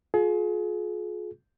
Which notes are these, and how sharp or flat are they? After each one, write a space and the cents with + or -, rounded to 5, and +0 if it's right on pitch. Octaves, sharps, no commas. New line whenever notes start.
F4 +35 G#4 +35